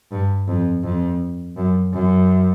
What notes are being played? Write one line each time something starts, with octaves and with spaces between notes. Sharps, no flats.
G2
F2
F2
F#2
F#2